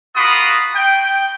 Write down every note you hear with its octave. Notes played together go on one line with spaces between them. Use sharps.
A#3 F4 F#4 B5 D#6
G5